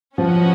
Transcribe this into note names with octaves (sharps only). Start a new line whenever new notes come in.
F3 C#4 F#4 B4 D#5 F#5